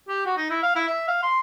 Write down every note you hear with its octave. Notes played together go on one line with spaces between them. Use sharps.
G4
F#4
D#4
E4
F5
E4
E5
F5
C6